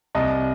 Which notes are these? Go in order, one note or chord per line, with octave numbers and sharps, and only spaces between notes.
C2 D#5